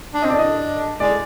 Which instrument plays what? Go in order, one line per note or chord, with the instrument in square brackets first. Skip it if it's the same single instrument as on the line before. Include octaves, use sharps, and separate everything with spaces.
[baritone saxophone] D4
[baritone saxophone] C4 [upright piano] D#5
[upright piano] D5
[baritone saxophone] D4 [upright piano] D#5
[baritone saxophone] G#3 [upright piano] D5